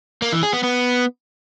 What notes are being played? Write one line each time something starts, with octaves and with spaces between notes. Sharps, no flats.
A#3
E3
G#4
B3
B3